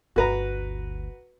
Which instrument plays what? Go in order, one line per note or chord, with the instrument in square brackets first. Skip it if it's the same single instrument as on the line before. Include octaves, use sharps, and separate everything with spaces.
[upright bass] G1 D2 [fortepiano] F#4 B4 A#5